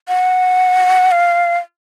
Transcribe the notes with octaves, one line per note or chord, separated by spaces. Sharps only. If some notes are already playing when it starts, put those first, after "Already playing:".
F#5
F5